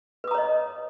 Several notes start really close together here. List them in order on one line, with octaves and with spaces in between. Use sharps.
B4 D#6 A#5 C#5 D#5